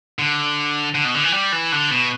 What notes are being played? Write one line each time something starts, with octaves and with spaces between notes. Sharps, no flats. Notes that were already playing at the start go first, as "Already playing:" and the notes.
D3
D3
B2
D3
E3
G3
E3
D3
B2